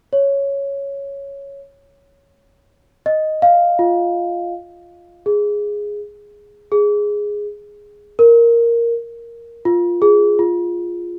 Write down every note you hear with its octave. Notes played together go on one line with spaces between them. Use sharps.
C#5
D#5
F5
F4
G#4
G#4
A#4
F4
G#4
F4